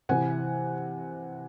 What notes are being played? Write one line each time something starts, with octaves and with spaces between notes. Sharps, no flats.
C3 E3 F#5 G#5